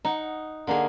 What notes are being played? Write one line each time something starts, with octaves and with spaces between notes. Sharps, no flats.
D#4 F#5
D3 A#3 D#4 G#4